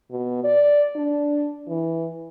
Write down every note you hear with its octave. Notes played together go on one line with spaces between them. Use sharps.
B2
D5
D4
E3